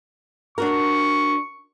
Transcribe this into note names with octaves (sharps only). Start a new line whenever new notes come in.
D4 F#4 A#4 C#6